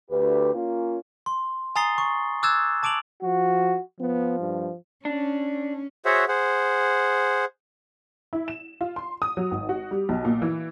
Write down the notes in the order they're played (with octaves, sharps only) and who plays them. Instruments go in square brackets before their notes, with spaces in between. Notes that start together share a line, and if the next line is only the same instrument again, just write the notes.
[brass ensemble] D2 G4 B4
A#3 C#4 F4
[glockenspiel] C6
G#5 A#5 D#6 A6 C7 G7
C#6
D6 E6 F#6 G#6 A6 E7
A5 D6 D7 F7 F#7
[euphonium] F3 [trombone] F#4
[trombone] F3 [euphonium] B3
[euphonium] G2
[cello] C#4 [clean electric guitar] D4
[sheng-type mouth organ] F#4 G#4 C5 C#5 E5 F#5
G#4 C5 F#5
[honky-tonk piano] E4
E7
F4
C6
D#6
F#3
G#1
F#4
G3
B1
A#2
E3